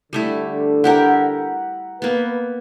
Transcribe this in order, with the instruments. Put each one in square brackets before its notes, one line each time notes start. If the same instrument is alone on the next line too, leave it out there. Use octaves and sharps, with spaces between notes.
[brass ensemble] D3 [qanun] G3 A3 E4
[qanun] E4 G4 A#4 [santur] F#5 A#5
[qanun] A#3 B3 [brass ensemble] B4